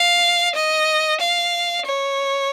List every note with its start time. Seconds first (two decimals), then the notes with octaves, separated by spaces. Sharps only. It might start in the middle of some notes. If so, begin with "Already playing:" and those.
Already playing: F5
0.55 D#5
1.20 F5
1.86 C#5